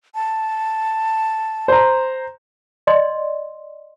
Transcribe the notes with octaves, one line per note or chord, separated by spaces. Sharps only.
A5
C5 A#5
D5 D#5 C6